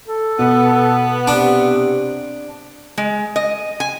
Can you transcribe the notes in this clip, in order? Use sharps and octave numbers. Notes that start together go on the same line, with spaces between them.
A4
B2 B3
C3 D4
G#3
D#5
G#5